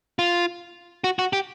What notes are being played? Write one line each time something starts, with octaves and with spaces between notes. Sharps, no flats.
F4
F#4
F#4
G4